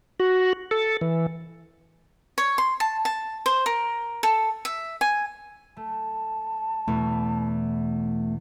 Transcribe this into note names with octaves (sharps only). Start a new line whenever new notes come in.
F#4
A4
E3
C#5
C6
A5
A5
C5
A#4
A4
E5
G#5
A3 A5
E2 B2 A3 C#6